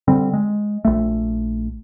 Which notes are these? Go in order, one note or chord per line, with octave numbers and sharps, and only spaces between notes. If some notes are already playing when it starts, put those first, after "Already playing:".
D3 G3 C4
G#3
A#1 A3